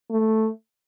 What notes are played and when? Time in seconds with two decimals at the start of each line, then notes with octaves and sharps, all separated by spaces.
0.11 A3